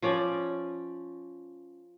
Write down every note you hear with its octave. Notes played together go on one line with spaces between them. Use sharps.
F3 C#4 D5